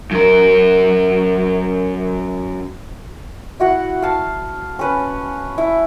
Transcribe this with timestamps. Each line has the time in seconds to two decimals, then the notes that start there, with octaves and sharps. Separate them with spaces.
0.11 F#2 A#4
3.60 E4 F#4 F#5
4.02 F5 A5
4.79 C#4 B4
5.58 E4